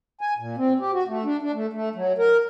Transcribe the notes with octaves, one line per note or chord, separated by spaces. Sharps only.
G#5
A#2
C4
G4
F#4
A3
D4
D4
A3
A3
F#3
A#4